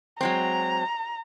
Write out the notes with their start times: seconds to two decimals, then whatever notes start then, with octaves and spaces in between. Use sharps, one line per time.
0.21 F#3 G#3 C4 A#5